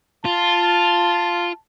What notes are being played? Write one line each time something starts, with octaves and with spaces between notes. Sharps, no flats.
F4 A5